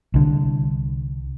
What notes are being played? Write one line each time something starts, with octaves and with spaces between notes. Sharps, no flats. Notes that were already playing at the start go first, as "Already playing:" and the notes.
C2 D3